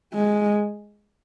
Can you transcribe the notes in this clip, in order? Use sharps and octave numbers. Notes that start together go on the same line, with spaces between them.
G#3